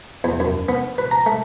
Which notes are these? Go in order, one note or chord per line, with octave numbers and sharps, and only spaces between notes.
E2
F#2
B3
B4
A#5
A3